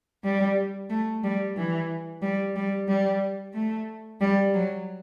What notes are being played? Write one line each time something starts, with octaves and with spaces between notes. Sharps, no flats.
G3
A3
G3
E3
G3
G3
G3
A3
G3
F#3